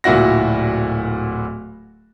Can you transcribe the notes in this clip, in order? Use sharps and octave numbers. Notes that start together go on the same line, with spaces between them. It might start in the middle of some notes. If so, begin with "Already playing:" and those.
D1 A#2 E4 F#4 A#6